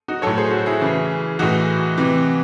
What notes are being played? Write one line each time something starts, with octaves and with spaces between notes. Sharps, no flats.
D#4 F#4
A2 F#3 A4 C#5
G#4 C5
F#4 A4
E4 G#4
C#3 E3
A2 E3 D#4 F#4
C3 E3